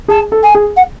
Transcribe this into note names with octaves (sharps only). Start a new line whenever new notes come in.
G#4 A5
A4
G#5
G#4
F#5